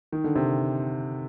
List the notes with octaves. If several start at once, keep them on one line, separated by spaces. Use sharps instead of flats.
D#3
D3
C3